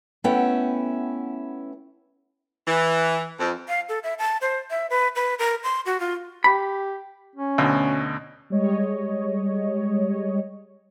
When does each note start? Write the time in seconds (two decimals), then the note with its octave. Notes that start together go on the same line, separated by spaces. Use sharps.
0.24 A3 B3 C#4 E4 F#5 G5
2.68 E3
3.40 F2
3.68 F5
3.89 A4
4.03 E5
4.19 A5
4.41 C5
4.71 E5
4.90 B4
5.16 B4
5.39 A#4
5.64 C6
5.86 F#4
6.00 F4
6.44 G4 B5
7.36 C#4
7.58 D2 B2
8.50 G3 G#3 C#5 D#5